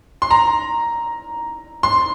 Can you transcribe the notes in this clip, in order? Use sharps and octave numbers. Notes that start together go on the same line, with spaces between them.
C6
A#5
C6